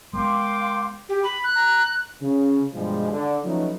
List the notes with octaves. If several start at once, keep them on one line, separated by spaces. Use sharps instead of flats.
G#3 A3 B3 A#4 F5 G5 C6 D6
G4
B5
F#6
A#5
C#3
G2 B2 F3 G3 G#3
D3
F3 F#3 A3 B3 C#4 D#4